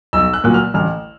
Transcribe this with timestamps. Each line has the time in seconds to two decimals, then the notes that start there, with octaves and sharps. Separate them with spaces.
0.13 B1 E6
0.34 F#6
0.44 A#2 F#3 F#6
0.54 F6
0.74 A1 F6